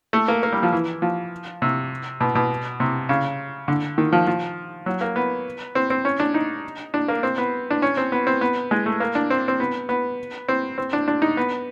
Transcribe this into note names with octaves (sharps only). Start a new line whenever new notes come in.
A3
A#3
A#3
G3
F3
E3
F3
C3
B2
B2
C3
C#3
D3
D#3
F3
F3
F#3
A#3
B3
C4
C4
C#4
D4
D#4
D4
A#3
C4
B3
D4
C#4
C4
B3
C4
B3
G#3
A3
A#3
D4
C4
C4
B3
B3
C4
C4
D4
D4
D#4
B3